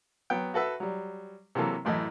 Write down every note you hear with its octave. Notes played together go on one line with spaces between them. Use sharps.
F#3 B3 G5
F#4 A4 B4 E5
F#3 G3
C3 E3 F#3 A#3 A4
A1 F#2 A2 E3 A3 D#5